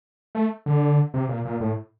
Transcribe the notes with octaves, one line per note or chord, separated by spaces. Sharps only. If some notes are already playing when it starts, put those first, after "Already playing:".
A3
D3
C3
A#2
A#2
A2